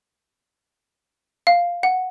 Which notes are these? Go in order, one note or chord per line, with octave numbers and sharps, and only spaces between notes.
F5
F#5